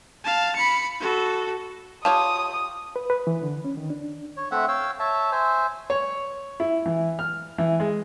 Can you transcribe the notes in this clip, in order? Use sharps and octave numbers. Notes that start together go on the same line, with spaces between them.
F5 A5
B5 C#7
F#4 A4
F4 G4 C#5 A5 D#6
B4
B4
E3
D3
C#4
D#3
D4
C#5
A3 C4 E5 F#5
C#5 F5 G5 E6
C#5 E5 A5
C5 E5 G#5
C#5
E4
E3
F6
E3
G#3